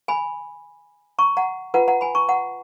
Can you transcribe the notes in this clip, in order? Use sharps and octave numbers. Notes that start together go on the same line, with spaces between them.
G#5 B5
A#5 C#6
F#5 A#5
F4 B4 F#5 A#5
F#5 A#5
G#5 B5
A#5 C#6
F#5 A#5